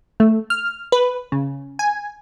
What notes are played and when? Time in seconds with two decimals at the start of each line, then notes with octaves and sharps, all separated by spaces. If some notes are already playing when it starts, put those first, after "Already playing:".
0.20 A3
0.50 F6
0.92 B4
1.32 C#3
1.79 G#5